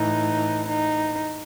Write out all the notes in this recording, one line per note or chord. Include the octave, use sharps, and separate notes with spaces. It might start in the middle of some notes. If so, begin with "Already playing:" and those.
Already playing: A2 E3 D#4
D#4